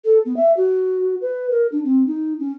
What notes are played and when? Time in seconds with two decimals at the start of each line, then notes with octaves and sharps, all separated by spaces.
0.05 A4
0.25 B3
0.36 E5
0.57 F#4
1.21 B4
1.51 A#4
1.72 D4
1.84 C4
2.07 D#4
2.39 C#4